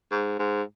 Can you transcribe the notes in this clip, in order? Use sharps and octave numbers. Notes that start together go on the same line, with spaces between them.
G#2
G#2